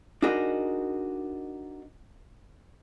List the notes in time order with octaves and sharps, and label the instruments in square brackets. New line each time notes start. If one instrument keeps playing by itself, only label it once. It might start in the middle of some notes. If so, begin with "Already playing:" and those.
[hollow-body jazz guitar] D4 D#4 F#4 G#4 A#4 D#5